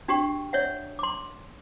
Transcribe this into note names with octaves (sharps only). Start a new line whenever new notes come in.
D4 F#4 G4 G5 C#6
C#5 D5 E5 F#5
C6 D6